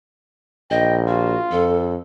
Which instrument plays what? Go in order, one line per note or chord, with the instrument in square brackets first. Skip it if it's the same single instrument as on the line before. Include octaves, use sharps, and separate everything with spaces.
[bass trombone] A#1 [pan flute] D#5 [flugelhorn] G5
[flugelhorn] F4 [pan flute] F#4
[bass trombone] F2 [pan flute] A4